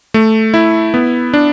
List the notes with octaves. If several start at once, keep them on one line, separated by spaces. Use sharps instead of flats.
A3
E4
B3
D4